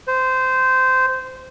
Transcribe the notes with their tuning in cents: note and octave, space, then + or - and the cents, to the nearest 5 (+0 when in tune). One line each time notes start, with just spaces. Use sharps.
C5 -15